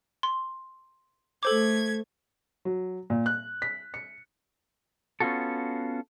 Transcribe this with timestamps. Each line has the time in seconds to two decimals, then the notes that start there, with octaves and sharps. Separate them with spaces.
0.23 C6
1.43 A3 A4 C5 D6 G#6
2.65 F#3
3.10 A#2
3.26 F#6
3.62 B6
3.94 C#7
5.20 B3 C#4 D#4 F4 F#4 A4